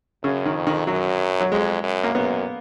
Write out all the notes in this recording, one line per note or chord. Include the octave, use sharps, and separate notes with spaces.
F#2 C#3
D#3
F2
D#3
F#2 F#3
F#3
F2 G#3
F#2
A#3
F#2 B3